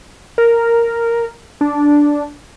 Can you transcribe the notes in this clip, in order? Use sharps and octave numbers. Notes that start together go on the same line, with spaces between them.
A#4
D4